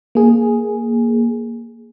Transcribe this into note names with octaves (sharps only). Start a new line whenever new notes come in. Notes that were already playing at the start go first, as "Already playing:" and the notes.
A#3 G#4